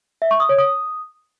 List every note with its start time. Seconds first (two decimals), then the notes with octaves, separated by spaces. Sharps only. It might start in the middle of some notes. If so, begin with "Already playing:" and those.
0.22 E5
0.31 C#6
0.40 D#6
0.49 C#5
0.58 D#6